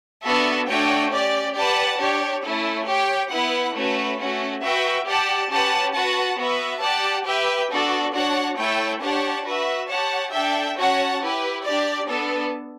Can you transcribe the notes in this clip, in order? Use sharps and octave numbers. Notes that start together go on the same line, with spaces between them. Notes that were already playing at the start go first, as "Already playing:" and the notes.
B3 D4 F#4 A4 E5
A3 D4 F#4 C#5 G5
C#4 G4 D5
G4 B4 D5 F#5 A5
D4 G4 C#5
A3 C#4 E4 A4
G4 C#5 G5
B3 E4 B4 F#5
A3 C#4 F#4 B4
A3 C#4 F#4
F#4 B4 E5 G5
G4 D5 F#5 A5
C#4 G4 B4 F#5 A5
F#4 B4 F#5 A5
B3 F#4 B4 E5
G4 D5 F#5 A5
G4 B4 E5 G5
B3 D4 F#4 A4 D5
D4 F#4 C#5 F#5 A5
A3 E4 A4 C#5 G5
D4 G4 C#5 F#5 A5
F#4 B4 E5
G4 C#5 F#5 A5
D4 A4 E5 G5
C#4 F#4 C#5 F#5 A5
E4 G4 B4
D4 G4 D5
B3 D4 A4